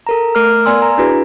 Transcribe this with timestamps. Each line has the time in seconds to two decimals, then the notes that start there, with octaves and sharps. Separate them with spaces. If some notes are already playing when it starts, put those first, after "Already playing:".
0.07 A4 A#4 A#5
0.35 A3 A#4 A#5 D6 F6
0.53 A#4
0.65 B3 D5 G#5 C6 E6
0.82 A#5
0.98 D4 E4 F#4 G#4 B4